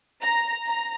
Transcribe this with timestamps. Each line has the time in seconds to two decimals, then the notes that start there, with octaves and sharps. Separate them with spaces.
0.22 A#5
0.66 A#5